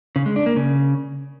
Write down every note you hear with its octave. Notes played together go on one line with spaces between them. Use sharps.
C#3
G#3
D4
A#3
C#3